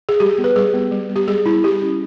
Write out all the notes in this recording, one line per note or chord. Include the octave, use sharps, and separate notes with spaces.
G#4
G3 G4
B3
B4
G3 G#4
B3
G3
B3
G4
G3 G#4
B3 E4
G3 G4
C#4